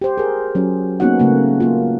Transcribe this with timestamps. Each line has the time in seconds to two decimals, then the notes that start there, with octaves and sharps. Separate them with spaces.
0.02 G4 C5
0.18 G#4 A#4
0.55 F#3 C#4
1.00 A#3 B3 C#4 D#4 F#4 F#5
1.19 C#3 A3 A#3
1.60 A#3 F4